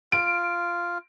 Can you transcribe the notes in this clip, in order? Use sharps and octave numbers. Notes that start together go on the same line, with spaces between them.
F4 D7